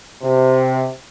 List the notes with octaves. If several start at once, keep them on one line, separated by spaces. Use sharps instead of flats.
C3